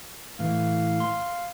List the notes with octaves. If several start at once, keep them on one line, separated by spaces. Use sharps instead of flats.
A2 E3 F5
C6